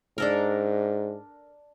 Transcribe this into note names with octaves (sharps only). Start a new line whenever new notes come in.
G#2 D4 A4 A#4